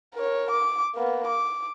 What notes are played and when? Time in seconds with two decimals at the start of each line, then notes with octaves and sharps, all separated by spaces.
0.15 A#4 C#5
0.51 D6
0.96 A#3 B3
1.27 D6